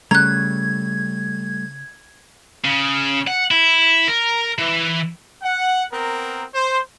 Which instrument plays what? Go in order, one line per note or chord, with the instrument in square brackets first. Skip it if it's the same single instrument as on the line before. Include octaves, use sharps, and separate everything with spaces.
[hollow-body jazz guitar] C#3 [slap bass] G3 A3 [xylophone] A#5 F#6 [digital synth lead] G#6
[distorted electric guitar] C#3
F#5
E4
A#4
E3
[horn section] F#5
B3 C4 A#4
C5